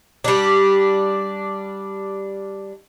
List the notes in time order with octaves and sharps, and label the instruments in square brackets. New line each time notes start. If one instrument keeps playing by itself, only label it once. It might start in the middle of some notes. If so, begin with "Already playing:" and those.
[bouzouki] G3 D4